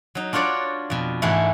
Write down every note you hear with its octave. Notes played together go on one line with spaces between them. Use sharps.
F#3 D#4
D4 F4 F#4 C#5 D5
F2 B2
G#2 E3 G#3 A3 E4